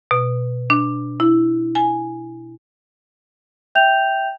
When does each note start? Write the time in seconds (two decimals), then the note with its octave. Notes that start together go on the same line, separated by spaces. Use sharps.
0.11 B2
0.70 D4
1.20 E4
1.75 G#5
3.75 E5 G5 G6 F7